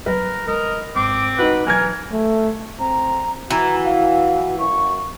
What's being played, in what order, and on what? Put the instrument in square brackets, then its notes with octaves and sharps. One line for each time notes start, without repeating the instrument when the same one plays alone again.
[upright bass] F#3 B3 [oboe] A#4 [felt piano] B4
[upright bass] G#3 [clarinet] A#4 [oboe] D#5
[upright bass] G#1 [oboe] C4 [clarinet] D6
[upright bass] C#2 [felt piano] D#4 F#4 [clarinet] B4
[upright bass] E1 F#3 [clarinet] E3 [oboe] A#4 [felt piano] G#5 F6 G#6
[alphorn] A3
[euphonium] C4 [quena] A#5
[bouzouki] E3 [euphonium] F#4 [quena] A#5
[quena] F5
[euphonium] F#2 [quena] C#6